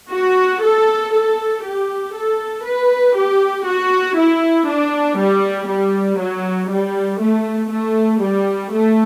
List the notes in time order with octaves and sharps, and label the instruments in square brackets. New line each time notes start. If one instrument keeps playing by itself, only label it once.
[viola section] F#4
A4
A4
G4
A4
B4
G4
F#4
E4
D4
G3
G3
F#3
G3
A3
A3
G3
A3